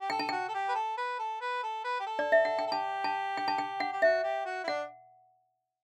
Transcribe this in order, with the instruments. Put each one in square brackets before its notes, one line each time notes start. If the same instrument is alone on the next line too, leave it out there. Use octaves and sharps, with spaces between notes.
[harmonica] G4
[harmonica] A4 [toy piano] G5
[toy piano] A5
[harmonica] F#4 [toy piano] G5
[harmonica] A4
G4
B4
A4
B4
A4
B4
A4
B4
G4
A4
[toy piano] D5
E5
F#5
G5
[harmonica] A4
[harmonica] G4 [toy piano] A5
[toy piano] A5
G5
A5
G5
F#5
[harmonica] G4
[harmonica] F#4 [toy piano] E5
[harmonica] G4
F#4
E4
[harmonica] D4 [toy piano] F#5